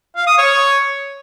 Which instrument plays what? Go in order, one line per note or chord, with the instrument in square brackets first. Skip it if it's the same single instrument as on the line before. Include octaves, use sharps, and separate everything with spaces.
[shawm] F5
D#6
C#5